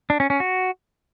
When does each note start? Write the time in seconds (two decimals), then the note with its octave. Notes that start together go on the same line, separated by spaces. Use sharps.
0.10 D4
0.20 C#4
0.30 C#4
0.40 F#4